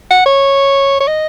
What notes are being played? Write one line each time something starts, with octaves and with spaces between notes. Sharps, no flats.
F#5
C#5
C#5
D#5